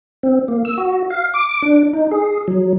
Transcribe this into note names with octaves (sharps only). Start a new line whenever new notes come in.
C4
A#3
E6
F#4
F5
D6
D4
D#4
G#4
F#3